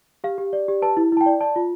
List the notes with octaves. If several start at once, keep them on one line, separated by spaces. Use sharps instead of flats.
G4 F5
G4
D5
G4
B4 A5
E4
E4 A5
G5
D5
D5 A5
F4